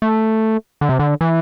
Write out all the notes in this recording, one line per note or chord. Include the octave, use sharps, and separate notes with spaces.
A3
D3
C3
D3
E3